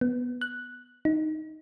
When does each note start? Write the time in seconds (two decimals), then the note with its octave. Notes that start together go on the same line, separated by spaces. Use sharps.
0.01 B3
0.41 F#6
1.05 D#4